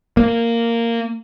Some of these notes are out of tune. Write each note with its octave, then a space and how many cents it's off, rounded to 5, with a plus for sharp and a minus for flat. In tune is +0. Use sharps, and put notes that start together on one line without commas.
A#3 -10